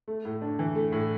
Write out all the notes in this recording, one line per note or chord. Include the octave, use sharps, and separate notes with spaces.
A3
A2
D4
E3
A3
A2